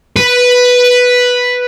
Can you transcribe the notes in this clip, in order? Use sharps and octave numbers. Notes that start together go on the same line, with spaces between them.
B4